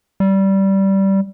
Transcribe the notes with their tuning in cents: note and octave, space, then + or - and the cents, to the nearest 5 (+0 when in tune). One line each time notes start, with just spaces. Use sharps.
G3 -15